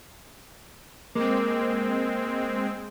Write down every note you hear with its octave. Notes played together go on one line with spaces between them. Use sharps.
G#3 A#3 C4